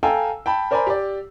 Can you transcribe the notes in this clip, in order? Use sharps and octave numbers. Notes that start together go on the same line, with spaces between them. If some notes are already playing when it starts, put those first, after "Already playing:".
A4 F5 G5 G#5 A#5 E6
G5 A5 B5
A#4 C5 D5 G#5 A#5 B5
G4 D5